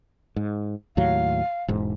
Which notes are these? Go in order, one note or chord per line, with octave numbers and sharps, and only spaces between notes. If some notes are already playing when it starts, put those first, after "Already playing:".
G#2
D#2 A2 F#3 F5
E1 G#2